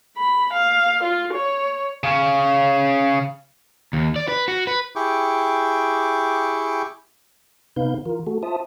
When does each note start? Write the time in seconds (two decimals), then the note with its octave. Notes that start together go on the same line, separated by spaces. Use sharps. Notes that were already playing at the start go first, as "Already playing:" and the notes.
0.17 B5
0.53 F5
1.03 F4
1.33 C#5
2.03 C#3 C#4
3.93 D#2
4.16 D5
4.28 B4
4.48 F#4
4.67 B4
4.96 E4 G4 G#4 G5 C#6 D6
7.76 C3 B3 D#4 B4 F5 G6
8.06 E3 F4 A#4
8.27 A3 F#4 A4
8.43 F4 C5 E5 A5 D#6